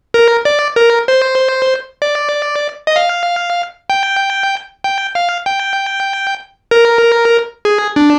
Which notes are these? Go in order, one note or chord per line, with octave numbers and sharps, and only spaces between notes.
A#4
D5
A#4
C5
D5
D#5
F5
G5
G5
F5
G5
A#4
G#4
D4